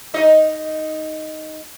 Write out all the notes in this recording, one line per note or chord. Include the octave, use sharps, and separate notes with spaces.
D#4 D#5